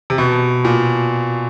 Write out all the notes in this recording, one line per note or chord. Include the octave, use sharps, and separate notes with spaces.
C3
B2
A#2